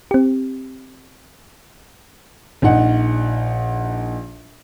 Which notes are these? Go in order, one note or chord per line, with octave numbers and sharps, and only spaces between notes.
C4 G4
A#1 D#4 F#5